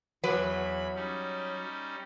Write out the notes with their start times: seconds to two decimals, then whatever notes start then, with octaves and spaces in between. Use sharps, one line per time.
0.24 E2 F#3 B4 B5
0.95 G3 C#4 D#4